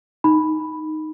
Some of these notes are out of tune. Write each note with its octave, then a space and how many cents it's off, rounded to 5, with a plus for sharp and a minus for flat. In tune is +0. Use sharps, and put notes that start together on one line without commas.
D#4 +0 B5 +0